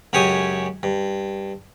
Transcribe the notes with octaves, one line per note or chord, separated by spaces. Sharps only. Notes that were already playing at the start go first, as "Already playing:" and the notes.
C#2 F#2 G4 C#5 G#5 D#6
G2